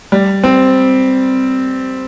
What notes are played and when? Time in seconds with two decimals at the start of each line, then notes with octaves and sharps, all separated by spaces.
0.12 G3
0.44 C4